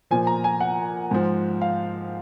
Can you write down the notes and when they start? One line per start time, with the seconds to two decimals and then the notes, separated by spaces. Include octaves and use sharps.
0.11 A#2 F3 G#5
0.27 A#5
0.44 G#5
0.60 F#5
1.11 G#2 F3
1.61 F5